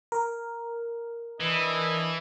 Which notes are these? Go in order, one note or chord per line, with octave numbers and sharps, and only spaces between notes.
A#4
E3 D4 E4 D#5